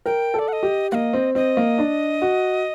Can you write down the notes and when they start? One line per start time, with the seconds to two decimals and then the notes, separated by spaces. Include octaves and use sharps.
0.06 A#4 G5
0.34 A4
0.39 D5
0.48 F#5
0.53 D#5
0.63 G4
0.91 A#3 D#5 F#5
1.13 C4
1.35 C4 D#5
1.57 A#3
1.78 D4
2.22 F#4